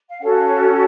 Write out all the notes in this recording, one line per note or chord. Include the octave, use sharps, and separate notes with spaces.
F5
C#4 F#4 A4 F#5
F5
C#5